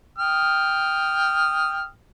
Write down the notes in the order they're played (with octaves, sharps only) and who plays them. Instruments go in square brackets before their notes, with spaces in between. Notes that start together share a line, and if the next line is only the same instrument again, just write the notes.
[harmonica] G5 D#6 F6